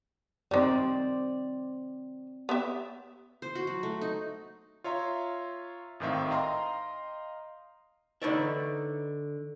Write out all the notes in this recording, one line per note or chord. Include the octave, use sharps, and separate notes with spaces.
D#3 G3 C4 C5 D5
B3 G4 E5
C5
F#4
F#3
A3
D#4
F4 C#5 E5 A#5 C6
G#1 A2 D#3 C4 E5 F5
D#5 F5 G5 A#5 C6
D3 D#4 B4 C#5 D5 E5